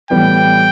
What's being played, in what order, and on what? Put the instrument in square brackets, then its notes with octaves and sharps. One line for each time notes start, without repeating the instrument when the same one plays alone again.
[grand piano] A2 E3 G3 B3 [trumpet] G5